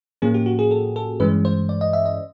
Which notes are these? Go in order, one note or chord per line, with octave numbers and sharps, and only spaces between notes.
A2 F3 A#3 C#4 G#4
G4
F#4
G#4
A4
A4
G2 E3 G#3 C#4 B4
C5
D5
D#5
E5
D#5